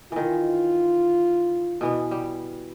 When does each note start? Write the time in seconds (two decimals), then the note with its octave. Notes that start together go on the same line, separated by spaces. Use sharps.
0.12 D#3 E3 F4
1.81 B2 E3 B3
2.11 G3